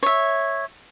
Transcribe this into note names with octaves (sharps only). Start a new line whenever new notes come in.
C#5 E5